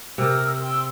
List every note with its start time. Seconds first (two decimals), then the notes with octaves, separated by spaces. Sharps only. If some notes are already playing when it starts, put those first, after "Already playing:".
0.18 C3 A#4 D#6 E6
0.60 G5 C6 E6